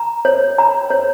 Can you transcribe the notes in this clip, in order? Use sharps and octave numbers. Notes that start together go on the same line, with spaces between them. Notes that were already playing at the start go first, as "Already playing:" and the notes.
Already playing: A#5
C#5
A#5
C#5